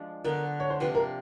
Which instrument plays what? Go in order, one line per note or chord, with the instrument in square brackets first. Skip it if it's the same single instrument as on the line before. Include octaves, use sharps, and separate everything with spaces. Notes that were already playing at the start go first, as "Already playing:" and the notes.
Already playing: [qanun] F3 G#3 D4
[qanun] D3 F#3 B3 [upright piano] A#4
[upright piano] C#5
C5
[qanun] C3 F3 A#3 D4 [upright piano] B4
[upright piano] A#4